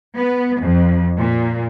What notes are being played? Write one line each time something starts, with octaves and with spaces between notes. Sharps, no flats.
B3
F2
A#2